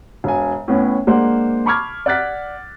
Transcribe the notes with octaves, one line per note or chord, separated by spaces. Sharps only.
E1 F5 G#5
A2 B3 C#4
G#3 A#3 D4 C5 F#5
A5 B5 C#6 D6 F6 G#6
D5 F#5 F6 F#6 A6 B6